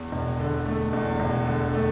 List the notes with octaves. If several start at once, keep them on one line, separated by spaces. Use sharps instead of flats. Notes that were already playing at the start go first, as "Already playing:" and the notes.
Already playing: E2
E1
D3
A3
E2
E1
D3
A3